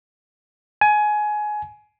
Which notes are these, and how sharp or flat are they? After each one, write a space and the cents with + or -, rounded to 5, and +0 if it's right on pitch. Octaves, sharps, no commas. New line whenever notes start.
G#5 +20